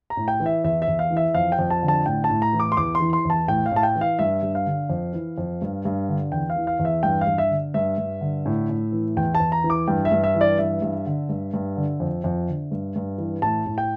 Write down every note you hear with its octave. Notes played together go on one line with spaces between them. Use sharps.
A#5
A2
G5
E3
E5
E2 E5
E5
E2
F5
E3
E5
F2 F5
G5
F2
A5
D3
A5
A2 G5
A5
A2
A#5
E3
D6
C6
E2 D6
C6
E3
C6
E2 A5
A2 G5
F5
A2 A5
G5
E3
F5
G2 E5
G2
F5
D3
F2
E3
F2
G2
G2
D3
E2 G5
F5
E3
F5
E2
E5
G2 G5
F5
G2
E5
D3
G2 E5
G2
D3
A2
A2
E3
E2 G5
A5
E2
A#5
E3
D6
G2 G5
E5
G2
E5
E3
D5
G2 E5
G2
D3
G2
G2
D3
F2
F2
D3
G2
G2
E3
A2 A5
A2
G5